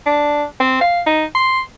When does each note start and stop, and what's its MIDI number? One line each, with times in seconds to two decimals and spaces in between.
0.06 0.44 62
0.60 0.78 60
0.81 1.01 77
1.07 1.25 63
1.35 1.62 84